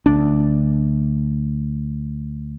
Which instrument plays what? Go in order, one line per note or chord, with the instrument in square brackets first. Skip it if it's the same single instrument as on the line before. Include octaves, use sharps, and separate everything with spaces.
[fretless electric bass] D2 D4